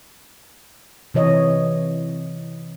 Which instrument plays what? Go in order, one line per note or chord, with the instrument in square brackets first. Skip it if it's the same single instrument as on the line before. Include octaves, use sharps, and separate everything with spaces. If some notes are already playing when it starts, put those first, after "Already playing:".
[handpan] C3 E3 C#5 D#5